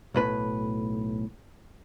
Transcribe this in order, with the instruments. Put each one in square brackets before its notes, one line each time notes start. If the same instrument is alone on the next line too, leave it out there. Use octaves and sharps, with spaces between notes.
[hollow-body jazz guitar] B1 A2 B4